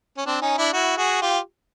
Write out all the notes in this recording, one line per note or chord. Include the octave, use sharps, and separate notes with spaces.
C#4
C4 D4
C#4 D#4
D4 E4
E4 F#4
F#4 G#4
F4 G4